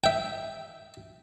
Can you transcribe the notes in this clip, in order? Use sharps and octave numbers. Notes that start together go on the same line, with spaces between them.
E5 G5